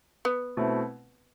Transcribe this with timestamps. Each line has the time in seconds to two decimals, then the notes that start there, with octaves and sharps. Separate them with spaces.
0.25 B3
0.57 B2 A3 C4 E4